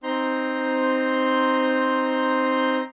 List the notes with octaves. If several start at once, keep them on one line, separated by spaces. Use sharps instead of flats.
C4 D#4 A#5 C6 G6